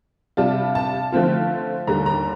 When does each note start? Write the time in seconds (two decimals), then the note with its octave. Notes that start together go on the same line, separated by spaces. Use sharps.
0.37 C3 G3 D4 F4 A5
0.75 A5
1.12 D3 F3 A3 C4 F4
1.87 D#2 D3 G3 A#5
2.06 A#5